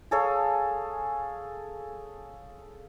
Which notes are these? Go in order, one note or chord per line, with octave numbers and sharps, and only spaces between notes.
G#4 A4 C#5 F5